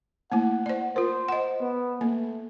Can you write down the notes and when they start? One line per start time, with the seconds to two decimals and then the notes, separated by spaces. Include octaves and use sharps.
0.32 A3 A#3 E4 F#5
0.66 C5 D5
0.96 F4 A#4 C5
1.28 D#5 F#5
1.61 B3
2.01 A3 A#3